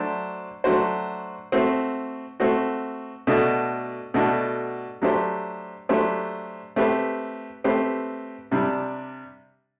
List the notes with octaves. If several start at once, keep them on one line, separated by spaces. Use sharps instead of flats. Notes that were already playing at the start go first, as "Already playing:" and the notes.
Already playing: F#3 A3 D4 F#4 C5
F#3 A3 D4 F#4 C5
A3 C4 F#4
A3 C4 F#4
B2 A3 D4 F#4 A4
B2 A3 D4 F#4 A4
F#3 A3 D4 G4 C5
F#3 A3 D4 G4 C5
A3 C4 G4 B4
A3 C4 G4 B4
C3 G3 D4